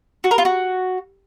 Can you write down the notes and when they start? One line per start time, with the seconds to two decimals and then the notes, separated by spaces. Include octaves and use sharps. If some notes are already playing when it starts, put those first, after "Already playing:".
0.24 F#4
0.31 A#4
0.38 F4
0.45 F#4